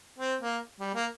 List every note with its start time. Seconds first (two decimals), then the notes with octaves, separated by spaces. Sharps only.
0.19 C4
0.41 A#3
0.80 G3
0.95 A#3